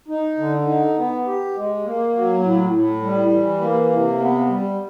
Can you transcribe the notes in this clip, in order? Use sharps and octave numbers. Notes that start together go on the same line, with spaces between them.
D#4
D3
D#4
B3
G4
G#3
A#3
F#3
A2
A2
G3
E3
A#3
C3
B3
G3